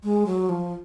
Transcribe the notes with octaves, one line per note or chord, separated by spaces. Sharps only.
G#3
F#3
F3